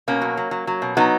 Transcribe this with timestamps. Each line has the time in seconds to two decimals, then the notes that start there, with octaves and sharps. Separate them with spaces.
0.08 B2 A#3 C#4
0.21 F#3
0.37 F#3
0.51 F#3
0.67 F#3
0.82 B2
0.97 F#3 B3 D#4